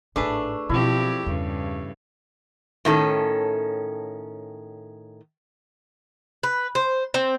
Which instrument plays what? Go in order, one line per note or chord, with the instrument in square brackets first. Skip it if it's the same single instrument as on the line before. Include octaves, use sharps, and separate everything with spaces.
[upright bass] G#1 A2 [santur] A3 [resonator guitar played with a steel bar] D4 G#4 B4
[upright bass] B2 F#3 [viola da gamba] F3 C4 G4 [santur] E4
[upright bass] E2 [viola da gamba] G2 C#3
[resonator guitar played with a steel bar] A2 D#3 C#4 A4
[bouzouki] B4
C5
C4